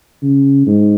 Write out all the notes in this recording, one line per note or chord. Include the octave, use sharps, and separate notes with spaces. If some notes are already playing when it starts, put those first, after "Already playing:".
C#3
G#2